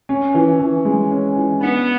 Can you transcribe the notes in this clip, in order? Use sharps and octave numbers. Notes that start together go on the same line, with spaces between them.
C#4
E3
E3
G#3
C#4
E3
B3 D4